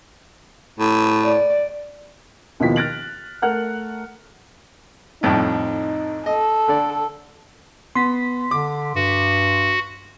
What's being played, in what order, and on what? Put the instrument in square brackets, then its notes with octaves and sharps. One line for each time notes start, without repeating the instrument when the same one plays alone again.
[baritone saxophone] A2
[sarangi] D5
[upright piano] D#2 B2 D#3 F3 E4 B6
F6 F#6 A6 A#6 D7 F#7
A3 A#4 F#5 F6 F#6
[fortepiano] C2 F2 A2 [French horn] D#4
[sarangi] A4 [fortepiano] D#5
[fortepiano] D3 D5
[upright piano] B3 [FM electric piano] C6 B6
[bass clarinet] D3 [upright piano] D6
[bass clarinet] G2 [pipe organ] F#4